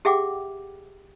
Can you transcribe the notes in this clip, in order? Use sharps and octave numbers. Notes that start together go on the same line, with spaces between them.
G4 G#4 E5 F#5 G5 D6